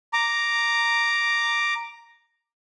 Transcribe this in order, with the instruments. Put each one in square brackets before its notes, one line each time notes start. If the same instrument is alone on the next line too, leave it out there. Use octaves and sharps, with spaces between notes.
[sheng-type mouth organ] A#5 D6